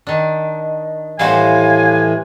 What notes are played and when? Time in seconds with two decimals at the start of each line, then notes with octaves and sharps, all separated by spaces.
0.07 D#3 D4
1.19 A2 E3 G3 F#4 C5 F5 G#5